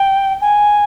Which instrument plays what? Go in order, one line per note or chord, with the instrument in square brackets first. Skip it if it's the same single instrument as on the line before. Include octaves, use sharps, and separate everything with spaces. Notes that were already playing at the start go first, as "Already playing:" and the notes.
Already playing: [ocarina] G5
G#5